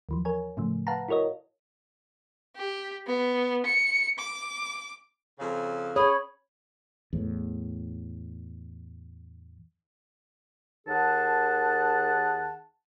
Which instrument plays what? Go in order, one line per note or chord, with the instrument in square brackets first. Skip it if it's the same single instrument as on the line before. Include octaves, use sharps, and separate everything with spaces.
[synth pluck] D#2 E3 F3
A#4 C#5 G#5
A2 C#3 F3 A3
B4 F5 F#5 A5 A#5
E4 F#4 A#4 C#5 D#5
[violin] G4
B3
C#7
D6
[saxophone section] F2 C#3
[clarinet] G#4 [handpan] C#5 [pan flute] B5
[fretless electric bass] E2 A2
[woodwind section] D#2 D#3 G#4 F#5 A5